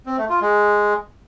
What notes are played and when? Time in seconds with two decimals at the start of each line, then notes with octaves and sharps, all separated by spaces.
0.06 C4
0.18 A3
0.29 F4
0.41 G#3